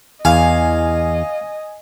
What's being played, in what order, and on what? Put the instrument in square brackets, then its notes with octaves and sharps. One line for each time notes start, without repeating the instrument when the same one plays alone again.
[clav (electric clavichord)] E2 [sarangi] D#5 [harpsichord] F5 [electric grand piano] G#5